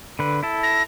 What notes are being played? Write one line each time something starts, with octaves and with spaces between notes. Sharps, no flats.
D3 B4
E4 A4
A#6